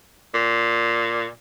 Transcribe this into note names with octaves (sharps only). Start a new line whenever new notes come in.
A#2